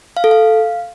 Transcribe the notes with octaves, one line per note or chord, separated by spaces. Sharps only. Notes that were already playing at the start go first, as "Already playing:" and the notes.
F5
A4
F5